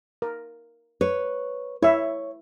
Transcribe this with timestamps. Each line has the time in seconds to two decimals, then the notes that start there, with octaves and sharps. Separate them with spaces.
0.22 A#4
1.01 B4 C#5
1.83 E4 C#5 E5